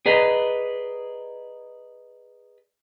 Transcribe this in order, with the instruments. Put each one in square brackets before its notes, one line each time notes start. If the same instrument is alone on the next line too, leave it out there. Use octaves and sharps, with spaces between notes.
[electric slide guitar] G#4 B4 D5 D#5 A#5